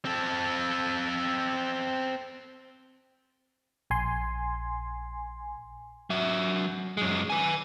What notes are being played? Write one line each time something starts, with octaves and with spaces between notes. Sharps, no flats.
C4 A4
A#1 G#5 C6
F#3 E5
F#2 G#3
B4 G#5